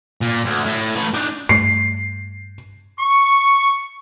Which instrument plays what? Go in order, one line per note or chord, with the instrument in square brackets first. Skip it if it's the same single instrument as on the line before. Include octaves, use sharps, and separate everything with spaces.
[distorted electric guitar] A#2
D2
A2
A3 B4
D4 D#4
[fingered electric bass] G2 A3 [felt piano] C7
[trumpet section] C#6